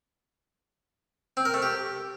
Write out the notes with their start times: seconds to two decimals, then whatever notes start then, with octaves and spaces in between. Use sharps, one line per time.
1.37 C4
1.45 A#4
1.54 A3
1.62 G4